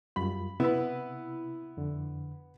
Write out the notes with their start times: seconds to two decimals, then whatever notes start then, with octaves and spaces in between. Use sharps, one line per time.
0.16 F#2 G3 F4 B5
0.60 C3 B3 E4 B4 E6
1.77 F2 D3